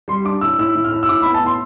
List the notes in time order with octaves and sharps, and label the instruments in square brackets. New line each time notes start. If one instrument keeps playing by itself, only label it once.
[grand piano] G3 C6
D4 D6
A2 E6
A2 E6
A2
F6
A2
E6
A2 D6
B5
B3
A5
A2 C6